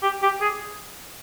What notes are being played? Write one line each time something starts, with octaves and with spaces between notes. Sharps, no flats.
G4
G4
G#4